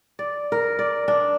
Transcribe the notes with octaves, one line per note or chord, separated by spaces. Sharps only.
D5
A#4
D5
D4